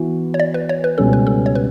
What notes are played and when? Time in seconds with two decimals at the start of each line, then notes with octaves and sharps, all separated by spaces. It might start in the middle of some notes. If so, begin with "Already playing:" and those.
Already playing: E3 B3 F#4
0.34 C#5
0.40 D5
0.54 B4
0.69 C#5
0.84 B4
0.98 C#2 B2 G3 C#4 A4
1.13 B4
1.27 A4
1.46 C#5
1.55 B4